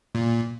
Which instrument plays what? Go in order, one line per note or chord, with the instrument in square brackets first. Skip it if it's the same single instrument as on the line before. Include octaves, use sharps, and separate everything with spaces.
[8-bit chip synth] A#2